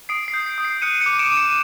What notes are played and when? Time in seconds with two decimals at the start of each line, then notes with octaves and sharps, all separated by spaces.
0.09 D#6 C7 D7
0.28 C7
0.34 G6
0.46 C7
0.58 D#6
0.65 C7
0.82 F#6 C#7 D#7
1.01 D6 C#7 D#7
1.19 D7 E7
1.31 D6
1.37 C#7 D#7